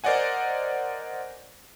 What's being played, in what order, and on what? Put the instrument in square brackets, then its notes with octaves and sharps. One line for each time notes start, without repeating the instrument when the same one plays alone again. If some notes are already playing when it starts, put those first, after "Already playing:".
[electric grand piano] A#4 C5 D5 D#5 F#5 G#5